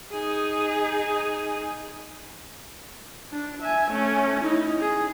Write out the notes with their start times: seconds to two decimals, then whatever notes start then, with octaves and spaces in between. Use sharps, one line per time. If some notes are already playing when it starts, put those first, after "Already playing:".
0.12 D#4 G#4
3.32 D4
3.62 E5 G#5
3.91 A3 C#4
4.44 D#4 E4
4.80 G#4